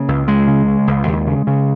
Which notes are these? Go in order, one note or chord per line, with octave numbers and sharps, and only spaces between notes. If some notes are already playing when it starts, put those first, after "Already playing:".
Already playing: C#3 A#3
C#2
C#2 G#3
C#3
C#3
C#2
D#2
C#3
C#3